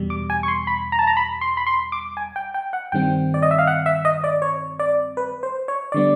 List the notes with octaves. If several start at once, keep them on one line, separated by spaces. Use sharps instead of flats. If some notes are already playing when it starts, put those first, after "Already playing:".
Already playing: E2 B2 G3
D6
G#5
C#6
C6
B5
A#5
A5
A#5
B5
C6
B5
C6
D6
G#5
G5
G5
F#5
G2 D#3 G3 C4 G5
D5
D#5
E5
F5
F#5
E5
D#5
D5
C#5
D5
B4
C5
C#5
D3 G3 B3 D5